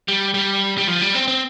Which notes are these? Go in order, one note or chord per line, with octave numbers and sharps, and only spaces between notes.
G3
G3
G3
F3
G3
C4
C4